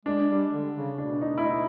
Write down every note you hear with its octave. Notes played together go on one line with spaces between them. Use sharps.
G#3 D4
G3
D3
C#3
B2 D4
D#4
E4
D#4